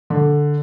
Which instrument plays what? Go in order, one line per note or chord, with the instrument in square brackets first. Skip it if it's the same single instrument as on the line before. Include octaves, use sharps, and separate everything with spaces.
[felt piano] D3